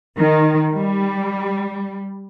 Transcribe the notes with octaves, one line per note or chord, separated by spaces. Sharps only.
D#3
G3